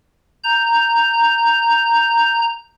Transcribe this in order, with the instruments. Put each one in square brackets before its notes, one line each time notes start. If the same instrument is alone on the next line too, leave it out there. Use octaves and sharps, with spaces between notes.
[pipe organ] A#5 G6